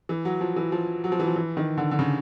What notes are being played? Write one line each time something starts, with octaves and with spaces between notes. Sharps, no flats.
E3
F#3
F3
E3
F3
F#3
F3
E3
F3
E3
D#3
D3
D3
C#3